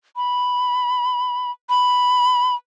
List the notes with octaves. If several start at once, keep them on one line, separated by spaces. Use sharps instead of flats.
B5
B5